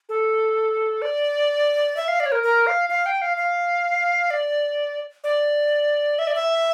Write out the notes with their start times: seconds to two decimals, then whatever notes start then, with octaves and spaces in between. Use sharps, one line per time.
0.09 A4
1.02 D5
1.97 E5
2.08 F5
2.20 D5
2.26 C#5
2.32 A#4
2.43 A#4
2.67 F5
2.90 F5
3.06 G5
3.21 F5
3.37 F5
4.30 D5
5.24 D5
6.19 E5
6.27 D5
6.35 E5